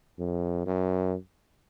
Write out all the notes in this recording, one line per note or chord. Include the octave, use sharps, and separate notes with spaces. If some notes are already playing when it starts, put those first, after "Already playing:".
F2
F#2